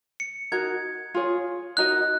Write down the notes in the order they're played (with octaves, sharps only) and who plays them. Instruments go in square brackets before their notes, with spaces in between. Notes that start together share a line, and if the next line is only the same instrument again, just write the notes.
[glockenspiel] C#7
[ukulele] D#4 F#4 A#4 [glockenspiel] G#6
[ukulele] F4 G#4 C#5
[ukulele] D#4 F#4 A#4 D#5 [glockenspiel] F#6